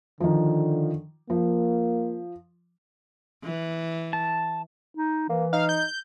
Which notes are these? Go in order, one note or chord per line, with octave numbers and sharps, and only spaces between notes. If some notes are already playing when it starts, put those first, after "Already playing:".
D3 D#3 F3
F3 A#3
E3
A5
D#4
E3 A#3
D#4 F5
G6